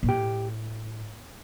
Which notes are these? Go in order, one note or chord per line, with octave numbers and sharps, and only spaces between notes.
A#2
A2 G4